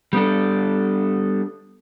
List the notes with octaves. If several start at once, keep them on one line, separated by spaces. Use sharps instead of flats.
G3 B3 D4 A4